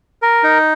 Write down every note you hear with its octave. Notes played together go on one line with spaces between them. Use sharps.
A#4
D#4